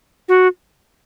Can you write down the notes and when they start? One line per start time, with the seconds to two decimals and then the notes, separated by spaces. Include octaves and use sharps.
0.29 F#4